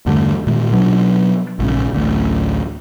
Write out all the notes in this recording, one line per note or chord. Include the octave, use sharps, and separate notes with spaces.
E2 G2 D3 A3
A#2 D#3 G#3
B2 F#3 D4
A#1 G#2 C#3
A1 D2